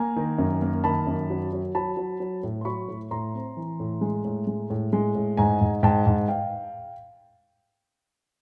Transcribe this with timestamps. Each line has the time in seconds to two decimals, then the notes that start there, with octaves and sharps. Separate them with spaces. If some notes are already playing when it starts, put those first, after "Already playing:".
Already playing: A#3 G#5 A#5
0.16 D#3
0.38 F#2
0.62 A#3
0.84 D#3 A5 B5
1.07 F#2
1.30 F#3
1.53 F#3
1.75 F#3 A5 B5
1.97 F#3
2.20 F#3
2.43 A2
2.61 C6
2.65 F#3 B5 C#6
2.88 A2
3.11 A2 A#5 C6
3.34 C4
3.57 E3
3.80 A2
4.01 G#3
4.25 A2
4.47 G#3
4.70 A2
4.93 G#3
5.15 A2
5.37 G#2 G#5 A#5
5.61 G#2
5.83 G#2 G5 A5
6.06 G#2
6.28 F5 G5